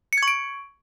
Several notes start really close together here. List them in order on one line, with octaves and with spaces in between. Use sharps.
C#7 G#6 C#6 D7